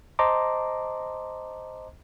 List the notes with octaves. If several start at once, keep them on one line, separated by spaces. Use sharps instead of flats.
C5 D#5 A5 A#5 C6 D6